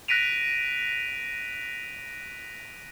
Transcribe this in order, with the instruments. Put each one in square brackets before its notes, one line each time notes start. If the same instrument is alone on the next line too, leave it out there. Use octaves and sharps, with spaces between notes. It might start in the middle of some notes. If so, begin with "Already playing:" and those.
[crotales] F#6 A#6 B6 D7 D#7 F7